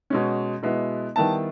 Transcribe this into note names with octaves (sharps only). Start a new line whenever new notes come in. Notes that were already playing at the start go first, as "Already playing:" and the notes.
B2 G#3 C#4
B2 G#3 B3 E4
D#3 G3 B3 E4 A5